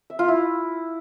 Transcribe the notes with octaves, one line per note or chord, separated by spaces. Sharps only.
E5
F4
E4